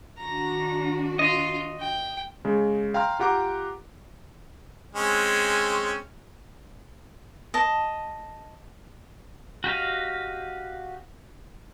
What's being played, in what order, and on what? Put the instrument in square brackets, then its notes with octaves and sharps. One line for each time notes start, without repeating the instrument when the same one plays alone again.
[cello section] D#3 D4 F#4 [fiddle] A#5
[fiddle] F4 [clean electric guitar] D#5
[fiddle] G5
[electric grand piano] C#3 G#3
F5 G5 A#5 C6 F6
F4 G4 F#5 A#5 D6
[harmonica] G#3 C4 C#4
[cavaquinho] D#5 A5
[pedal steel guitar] F#4 G4 D#5 F5